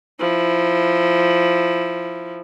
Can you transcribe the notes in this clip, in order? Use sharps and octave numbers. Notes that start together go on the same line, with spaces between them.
F3 E4